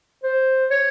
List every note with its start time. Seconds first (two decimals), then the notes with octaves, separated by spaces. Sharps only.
0.24 C5
0.70 C#5